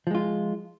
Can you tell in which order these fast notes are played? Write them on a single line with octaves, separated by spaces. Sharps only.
F3 G#3 F4